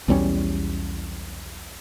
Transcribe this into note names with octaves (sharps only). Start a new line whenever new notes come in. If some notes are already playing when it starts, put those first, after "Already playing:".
B1 E2 G3 C#4